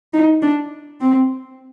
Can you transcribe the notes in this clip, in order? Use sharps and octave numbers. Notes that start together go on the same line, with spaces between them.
D#4
D4
C4